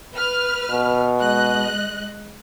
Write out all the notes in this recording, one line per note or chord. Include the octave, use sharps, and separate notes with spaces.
B4 F6
B2
G#3 D#5 F#6